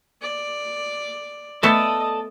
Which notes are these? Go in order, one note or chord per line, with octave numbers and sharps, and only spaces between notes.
D5
A3 B3 A4 D5 D#5 A5